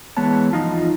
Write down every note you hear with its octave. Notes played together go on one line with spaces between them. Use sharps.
E3 G#3 B3 C#5 A5
E2 F3 D#4 F4